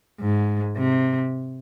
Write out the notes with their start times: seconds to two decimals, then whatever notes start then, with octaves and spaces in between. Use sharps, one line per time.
0.21 G#2
0.77 C3